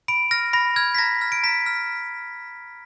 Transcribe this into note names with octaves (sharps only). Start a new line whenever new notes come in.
B5 D7
F6 A#6
B5 A#6
F6 G#6
B6
A#5 A#6
F6
D7
A#5 B6
F6